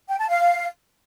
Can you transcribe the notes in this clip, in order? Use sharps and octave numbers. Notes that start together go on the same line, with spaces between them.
G5
A5
F5